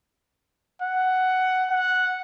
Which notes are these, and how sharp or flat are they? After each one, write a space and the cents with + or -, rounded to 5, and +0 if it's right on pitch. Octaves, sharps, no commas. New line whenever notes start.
F#5 +10
F#5 -5